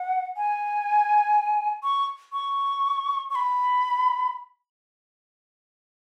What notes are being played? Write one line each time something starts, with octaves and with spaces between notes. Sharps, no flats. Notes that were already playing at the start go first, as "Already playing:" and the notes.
Already playing: F#5
G#5
C#6
C#6
C#6
B5